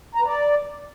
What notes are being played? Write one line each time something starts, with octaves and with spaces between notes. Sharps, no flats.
A#5
B4
D5